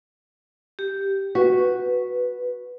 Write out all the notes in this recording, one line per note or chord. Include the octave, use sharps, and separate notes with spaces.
G4
F#4 B4